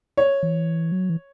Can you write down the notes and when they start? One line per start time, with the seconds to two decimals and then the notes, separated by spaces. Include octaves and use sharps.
0.17 C#5
0.43 E3
0.92 F#3
1.10 E3